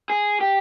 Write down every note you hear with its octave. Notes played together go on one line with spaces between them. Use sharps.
G#4
G4